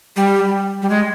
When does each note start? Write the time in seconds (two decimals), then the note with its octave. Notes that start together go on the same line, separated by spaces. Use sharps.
0.16 G3
0.82 G3
0.90 G#3